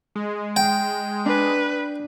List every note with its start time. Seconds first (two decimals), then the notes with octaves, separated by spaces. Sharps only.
0.16 G#3
0.56 G5
1.26 D4 B4